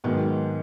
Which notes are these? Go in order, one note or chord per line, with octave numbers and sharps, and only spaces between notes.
G#2 D#3 F#3 B3